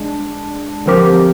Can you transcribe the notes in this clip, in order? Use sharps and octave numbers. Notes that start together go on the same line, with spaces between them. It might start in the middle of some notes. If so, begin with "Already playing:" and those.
Already playing: G#3 D4
D3 F3 C4 G4 A#4